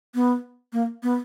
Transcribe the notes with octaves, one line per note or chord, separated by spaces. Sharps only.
B3
A#3
B3